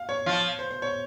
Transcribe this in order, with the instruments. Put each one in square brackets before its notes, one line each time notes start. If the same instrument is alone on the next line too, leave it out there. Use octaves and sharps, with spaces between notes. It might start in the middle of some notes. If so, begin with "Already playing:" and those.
Already playing: [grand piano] F5
C#5
[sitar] F3 F4
[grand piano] C5
C5
C#5